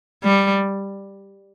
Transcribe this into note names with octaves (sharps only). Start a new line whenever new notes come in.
G3